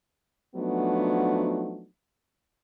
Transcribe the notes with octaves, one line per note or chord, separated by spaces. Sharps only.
F3 F#3 A3 B3 D4 D#4